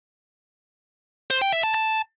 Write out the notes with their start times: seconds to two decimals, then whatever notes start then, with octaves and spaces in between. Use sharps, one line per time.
1.31 C5
1.42 G5
1.52 E5
1.63 A5
1.74 A5